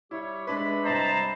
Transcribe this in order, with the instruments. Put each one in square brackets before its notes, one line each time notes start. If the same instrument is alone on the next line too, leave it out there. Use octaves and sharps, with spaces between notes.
[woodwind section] G3 G4 C#5 [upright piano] E4
[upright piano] G#3 D4 B4 [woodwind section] E5 B5
[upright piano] C2 D#5 [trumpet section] C5 A5 A#5